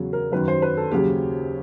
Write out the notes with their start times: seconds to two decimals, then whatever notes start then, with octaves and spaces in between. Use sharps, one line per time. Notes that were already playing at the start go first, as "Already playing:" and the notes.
Already playing: E2 C#3 F#3
0.13 A#4
0.32 F#2 D#3 F#3 B4
0.48 C5
0.62 B4
0.77 A4
0.91 D#2 C#3 F#3 G4